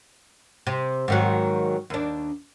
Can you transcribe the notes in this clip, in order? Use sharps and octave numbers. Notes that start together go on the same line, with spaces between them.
C3
G#2 D#3 F#3
D#2 D4